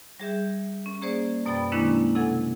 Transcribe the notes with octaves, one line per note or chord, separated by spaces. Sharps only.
G3 G#4 E5 G6
C#4
A#3 G#4 C5 D5
F#2 B2 D5 G5 B5 A6
D#3 G#3 A#3 C#4 D4 E4
C3 A4 F#5 G#5 G#6